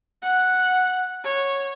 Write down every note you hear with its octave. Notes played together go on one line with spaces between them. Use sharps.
F#5
C#5